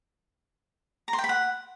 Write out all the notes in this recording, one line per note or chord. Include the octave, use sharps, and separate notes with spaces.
A#5
C6
G5
B5
F#5